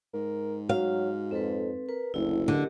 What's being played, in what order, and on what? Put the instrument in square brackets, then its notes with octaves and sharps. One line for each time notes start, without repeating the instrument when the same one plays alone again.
[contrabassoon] G#2 [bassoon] A#4
[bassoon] F#3 [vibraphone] F#4 [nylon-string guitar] F5
[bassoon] F2 [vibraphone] C4 A4 B4
[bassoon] A#4 [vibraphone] B4
[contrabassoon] F#1 [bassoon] D2 [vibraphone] E4
[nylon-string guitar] D3 [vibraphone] G4 A#4 D#5